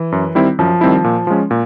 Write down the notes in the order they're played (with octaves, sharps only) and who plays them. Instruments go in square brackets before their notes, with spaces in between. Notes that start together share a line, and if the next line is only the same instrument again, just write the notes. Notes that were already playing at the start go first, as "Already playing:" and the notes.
Already playing: [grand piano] E3
[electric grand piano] F#2
D#3 G3 C4 E4
[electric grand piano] F#2 [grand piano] F3
[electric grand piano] D#3 G3 C4 E4
A#2
F3 G#3 C#4
A#2